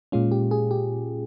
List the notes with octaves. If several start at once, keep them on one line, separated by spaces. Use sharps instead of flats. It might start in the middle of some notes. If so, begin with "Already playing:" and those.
A#2 G#3 C#4 F4
G4
G#4
G4